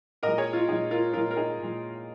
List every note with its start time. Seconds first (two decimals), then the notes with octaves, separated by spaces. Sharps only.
0.23 A#2 G#3 A#4 D#5
0.38 G#4 C#5
0.53 F4
0.68 A#2 G#3 D#4 G#4
0.91 F4 A#4
1.13 A#2 G#3 F4 A#4
1.31 A#4
1.36 D#4 G#4
1.59 A#2
1.64 G#3